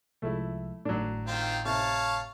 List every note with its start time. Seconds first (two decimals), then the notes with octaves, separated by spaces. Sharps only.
0.22 C2 F3 G#3 A3 E4
0.85 G#1 A2 F#3 D4
1.27 D#3 C4 F4
1.65 C3 C#5 F5 A5